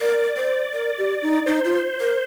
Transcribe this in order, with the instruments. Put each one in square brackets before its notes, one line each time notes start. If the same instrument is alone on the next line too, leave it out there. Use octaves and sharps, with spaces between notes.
[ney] A#4 [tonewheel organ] D5
[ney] C5
A#4
G4
D#4
[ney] D#4 [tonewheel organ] C5
[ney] F4
A#4